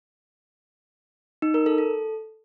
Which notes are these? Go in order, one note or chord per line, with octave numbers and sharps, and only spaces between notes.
D#4
A#4
A4
A4